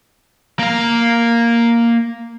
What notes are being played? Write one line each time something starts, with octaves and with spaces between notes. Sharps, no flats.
A#3 F5